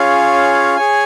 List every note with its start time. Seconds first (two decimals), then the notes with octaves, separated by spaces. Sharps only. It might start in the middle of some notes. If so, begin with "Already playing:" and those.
Already playing: C#4 F4 G#4 C#5 F5
0.76 G#4 C#5 G#5